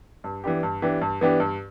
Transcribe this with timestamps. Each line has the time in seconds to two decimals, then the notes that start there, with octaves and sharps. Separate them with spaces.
0.24 G2
0.44 E3 B3 D4 G4
0.63 G2
0.82 E3 B3 D4 G4
1.01 G2
1.21 E3 B3 D4 G4
1.40 G2